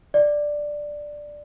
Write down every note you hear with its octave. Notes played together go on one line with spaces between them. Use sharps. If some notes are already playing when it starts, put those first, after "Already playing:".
D5